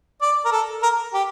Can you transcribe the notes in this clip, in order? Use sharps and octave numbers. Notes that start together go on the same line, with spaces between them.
D5
A#4
A4
A#4
G4